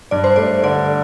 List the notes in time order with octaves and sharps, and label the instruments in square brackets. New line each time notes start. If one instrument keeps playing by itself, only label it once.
[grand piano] G2 [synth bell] D5
[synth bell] C5
[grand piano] A3 [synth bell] D5
[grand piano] D3 [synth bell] D5